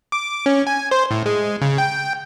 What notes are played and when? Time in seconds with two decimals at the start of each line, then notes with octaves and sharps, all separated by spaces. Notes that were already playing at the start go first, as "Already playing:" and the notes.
0.12 D6
0.46 C#4
0.67 G#5
0.91 C5
1.11 A2
1.26 G#3
1.62 C#3
1.78 G5